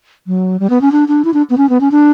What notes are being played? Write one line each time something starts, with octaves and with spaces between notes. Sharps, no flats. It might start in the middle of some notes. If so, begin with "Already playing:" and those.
F#3
G3
B3
C#4
D4
D4
E4
D4
B3
C#4
B3
C#4
D4